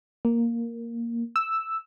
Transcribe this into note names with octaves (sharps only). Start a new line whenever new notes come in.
A#3
E6